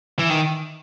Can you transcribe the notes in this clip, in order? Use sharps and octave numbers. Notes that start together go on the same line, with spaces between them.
E3
D#3